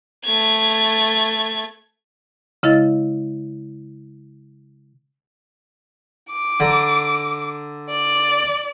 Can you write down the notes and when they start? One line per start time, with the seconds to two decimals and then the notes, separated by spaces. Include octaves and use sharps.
0.25 A3 G#6
2.63 C#3 G#3 E4 D#5 F5 A6
6.31 D6
6.60 D3 D4 A#5
7.90 D5